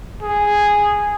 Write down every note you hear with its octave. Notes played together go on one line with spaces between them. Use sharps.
G#4